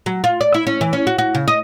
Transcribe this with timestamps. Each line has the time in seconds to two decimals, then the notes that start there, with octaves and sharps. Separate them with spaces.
0.06 F#3
0.24 F4
0.41 D5
0.54 E4
0.67 C#4
0.81 E3
0.93 C#4
1.07 F#4
1.18 F#4
1.35 C#3
1.48 D#5